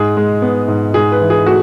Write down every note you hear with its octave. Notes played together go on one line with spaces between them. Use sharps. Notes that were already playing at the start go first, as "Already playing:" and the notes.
Already playing: G#2 G#4
G#3
B3
G#2
G#2 G#4
B4
E3
G#4
A3 F#4